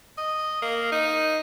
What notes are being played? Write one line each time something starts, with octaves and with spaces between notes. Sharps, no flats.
D#5
A#3
D#4